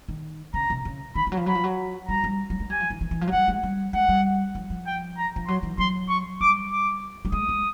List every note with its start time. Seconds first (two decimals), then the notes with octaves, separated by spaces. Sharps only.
0.08 D#3
0.54 C#3 A#5
0.70 C3
0.85 C#3
1.15 D#3 B5
1.27 E3
1.32 F#3
1.37 F3
1.46 F#3 B5
1.55 F3
1.64 F#3
2.08 G3 A#5
2.24 G3
2.50 F#3
2.60 G#3
2.70 G3 G#5
2.80 F3
2.90 E3
3.01 E3
3.11 E3
3.21 F3
3.27 F#3
3.32 G3 F#5
3.48 G#3
3.63 G3
3.93 G#3 F#5
4.09 G3
4.55 F3
4.70 F3
4.87 G5
5.18 A#5
5.36 F3
5.47 F#3 C6
5.63 E3
5.78 F#3 C6
6.09 C#6
6.41 G3 D6
6.71 D6
7.25 G3
7.32 G#3 D#6
7.49 G#3